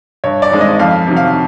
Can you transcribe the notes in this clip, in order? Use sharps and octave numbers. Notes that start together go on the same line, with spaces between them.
G2 C#5
D5
D#3 G#3 C4
D#5
F2 F5
C3 D#3 F#3
F5